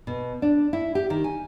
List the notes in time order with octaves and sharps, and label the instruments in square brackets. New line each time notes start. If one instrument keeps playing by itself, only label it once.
[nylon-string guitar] B2
D4
E4
G4
D#3
G#5